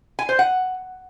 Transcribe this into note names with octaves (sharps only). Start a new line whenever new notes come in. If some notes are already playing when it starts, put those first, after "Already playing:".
G#5
C5
F#5